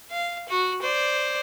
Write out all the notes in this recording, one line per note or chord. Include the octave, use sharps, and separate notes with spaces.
F5
F#4
C5 D5